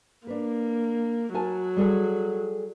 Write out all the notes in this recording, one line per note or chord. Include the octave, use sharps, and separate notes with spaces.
A#3 D4 B4
F#3 A#4 G#5 A5
G3 G#4 A4